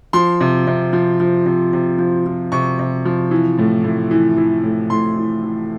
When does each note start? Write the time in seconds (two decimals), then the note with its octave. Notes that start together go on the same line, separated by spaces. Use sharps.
0.13 F3 C6
0.41 C3
0.67 C3
0.93 F3
1.20 F3
1.46 C3
1.73 C3
1.98 F3
2.26 F3
2.52 C3 C#6
2.79 C3
3.05 F3
3.31 E3
3.59 A2
3.84 A2
4.11 E3
4.37 E3
4.63 A2
4.90 A2 C6
5.17 E3
5.43 E3